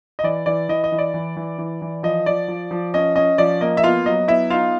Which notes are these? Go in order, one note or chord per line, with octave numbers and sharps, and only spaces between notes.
D#5
E3 D5
E3 D5
E3 D#5
D#5
E3
D5
E3
E3
E3
E3
F3 D#5
F3 D5
F3
F3
C#4 D#5
C#4 D#5
F3 D5
A#3 D#5
E5
B3 F4 F5
F#3 D#5
B3 E4 E5
D#4 F4 F5